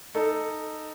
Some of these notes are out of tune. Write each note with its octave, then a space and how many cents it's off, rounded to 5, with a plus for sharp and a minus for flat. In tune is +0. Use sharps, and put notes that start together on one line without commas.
D#4 -10 A4 +0